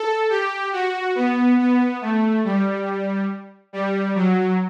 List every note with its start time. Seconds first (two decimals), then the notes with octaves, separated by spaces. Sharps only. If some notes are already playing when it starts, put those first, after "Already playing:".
Already playing: A4
0.30 G4
0.73 F#4
1.15 B3
1.59 B3
2.01 A3
2.45 G3
3.73 G3
4.15 F#3